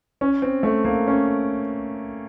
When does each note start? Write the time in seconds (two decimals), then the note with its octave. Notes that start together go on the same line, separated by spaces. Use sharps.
0.21 C#4
0.42 C4
0.63 A3
0.85 A#3
1.07 C#4